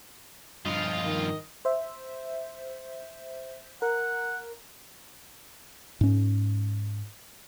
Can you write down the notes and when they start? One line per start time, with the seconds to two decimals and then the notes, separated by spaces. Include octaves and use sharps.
0.66 G2 F3 F4 D#5 F5
1.06 D#3
1.65 C5 E5
3.82 A#4 F#5
6.01 G#2 C#4